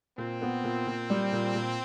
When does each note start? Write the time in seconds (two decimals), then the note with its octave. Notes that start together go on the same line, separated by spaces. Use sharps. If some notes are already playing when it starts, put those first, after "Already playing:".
0.18 A#2 C4
0.42 B3
0.64 A#2
0.87 A#2
1.10 G3
1.32 A#2
1.55 A#2